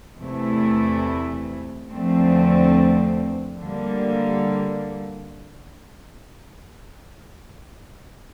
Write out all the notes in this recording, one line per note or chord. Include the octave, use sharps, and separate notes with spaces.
E2 C3 E3 A3 E4
E2 D3 F3 A3 C4
D3 G3 A#3